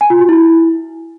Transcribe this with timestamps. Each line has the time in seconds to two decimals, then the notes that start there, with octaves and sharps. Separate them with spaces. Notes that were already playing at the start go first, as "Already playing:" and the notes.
0.01 G#5
0.10 F4
0.19 F#4
0.29 E4